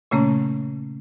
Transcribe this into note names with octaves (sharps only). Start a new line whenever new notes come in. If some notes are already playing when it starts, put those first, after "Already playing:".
A#2 C#3 A3 A#3 C#4